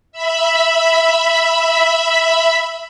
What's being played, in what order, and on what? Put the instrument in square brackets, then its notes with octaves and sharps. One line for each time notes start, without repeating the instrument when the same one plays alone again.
[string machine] E5 B5